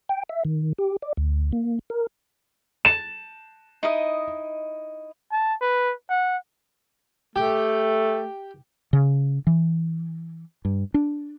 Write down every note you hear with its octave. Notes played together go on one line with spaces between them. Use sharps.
G5
E5
D#3
G4
D5
D2
A#3
A#4
A5 E7
D#4 E4 D#5
A5
B4
F#5
A3 G4
C#3
E3
G2
D4